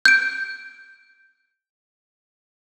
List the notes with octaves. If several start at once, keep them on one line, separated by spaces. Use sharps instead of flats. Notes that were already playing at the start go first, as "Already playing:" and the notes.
G6 D7